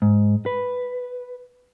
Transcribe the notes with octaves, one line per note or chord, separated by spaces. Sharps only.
G#2
B4